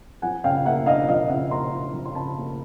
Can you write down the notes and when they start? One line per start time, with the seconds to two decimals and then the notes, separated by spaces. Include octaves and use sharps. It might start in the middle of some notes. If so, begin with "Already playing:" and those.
0.22 F3 F#5 G#5
0.44 C#3 F5 G5
0.65 A#3 E5 F#5
0.86 D4 D#5 F5
1.08 F3 D#5 F5
1.29 C#3 E5 F#5
1.51 A#3 A#5 C6
1.72 D4
1.93 F3
2.05 C6
2.15 C#3 A5 B5
2.37 A#3